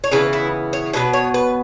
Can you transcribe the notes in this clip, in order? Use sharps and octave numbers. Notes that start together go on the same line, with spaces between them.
C#5
C#3 E3 B3 B4
E4
C#5
B2 F#3 B3 B4
C#5
B4